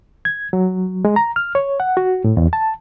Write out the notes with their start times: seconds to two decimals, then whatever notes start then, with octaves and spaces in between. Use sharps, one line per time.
0.25 G#6
0.53 F#3
1.05 G#3
1.16 A#5
1.36 F6
1.55 C#5
1.80 F#5
1.97 F#4
2.24 A2
2.37 E2
2.53 A5